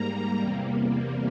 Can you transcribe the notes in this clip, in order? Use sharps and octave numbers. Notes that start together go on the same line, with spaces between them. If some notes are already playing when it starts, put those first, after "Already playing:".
Already playing: G#2 G3 A#3 A#5
E2 C3 G3 A#3